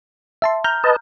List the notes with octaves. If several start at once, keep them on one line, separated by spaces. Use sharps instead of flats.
E5 A5 C6
A#5 F6 G6
B4 D#5 A5